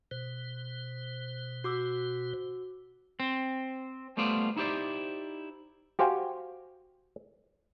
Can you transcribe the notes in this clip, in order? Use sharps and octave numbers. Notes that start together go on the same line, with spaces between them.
B2 C5
F#4 D6 E6
C4
G3 A3 B3 F4 C5 D5
D#4 E4 G4 C5 D5
F#4 G4 C5 F5 G5 G#5